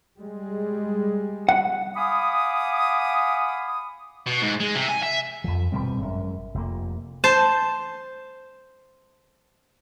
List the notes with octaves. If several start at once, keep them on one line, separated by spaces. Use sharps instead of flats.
G3 G#3
F#5
F5 F#5 G#5 B5 D6 D#6
B2
G#2
G#3
C3
G#5
E5
F2 F3
D#1 B2 G3 C4
G#1 F#2
F1 A#3
C5 A5